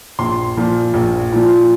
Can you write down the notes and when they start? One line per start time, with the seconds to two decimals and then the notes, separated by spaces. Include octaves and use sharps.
0.19 A#1 C6
0.57 A#2 F3
0.94 A#1
1.32 A#2 F3